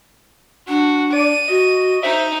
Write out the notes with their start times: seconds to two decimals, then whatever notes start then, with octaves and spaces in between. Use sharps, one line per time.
0.68 D4 F#4
1.13 D5 D#7
1.48 F#4 D#5
2.03 D#4 C5 E5